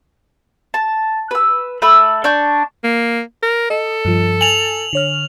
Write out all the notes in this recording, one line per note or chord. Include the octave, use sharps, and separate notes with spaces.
A5
B4 E6
A3 B5 E6
D4 C#6 G6
A#3
A#4
A4 D#5
G2 F3
G#5 F7 F#7
D3 C#5 F6